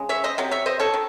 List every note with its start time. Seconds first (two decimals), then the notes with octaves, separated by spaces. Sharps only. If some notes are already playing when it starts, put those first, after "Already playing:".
Already playing: C#3 G#3
0.09 C#5 E5
0.24 C5 D#5
0.38 C3 F#3
0.51 C#5 E5
0.66 C5 D#5
0.79 A4 C#5
0.94 D#3